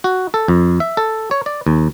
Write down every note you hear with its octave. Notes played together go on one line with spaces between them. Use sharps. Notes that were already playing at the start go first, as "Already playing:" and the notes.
F#4
A4
F2
E5
A4
C#5
D5
D#2